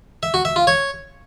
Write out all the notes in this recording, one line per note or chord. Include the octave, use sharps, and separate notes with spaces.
E5
F#4
E5
F4
C#5